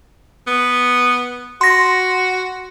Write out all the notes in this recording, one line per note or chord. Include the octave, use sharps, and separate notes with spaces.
B3
F#4 C6 A#6